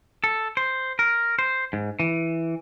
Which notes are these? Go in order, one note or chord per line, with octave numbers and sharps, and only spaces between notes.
A4
C5
A#4
C5
G#2
E3